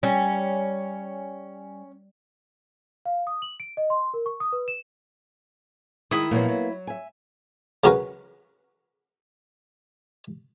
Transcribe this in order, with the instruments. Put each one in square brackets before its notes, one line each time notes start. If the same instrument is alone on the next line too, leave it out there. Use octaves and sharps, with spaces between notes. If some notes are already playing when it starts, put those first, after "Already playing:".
[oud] G3 [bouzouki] C#4
[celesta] F5
D#6
F#7
D7
D#5
C6
A#4
C#6
D#6
B4
E7
[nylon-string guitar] D#3 [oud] G#3 [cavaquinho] E4 D#6
[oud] A#2 F3 F#3 [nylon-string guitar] A#3 B3
[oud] F#3
[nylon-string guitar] E5 G#5
[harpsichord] C#3 F#3 C#4 F#4 A#4 B4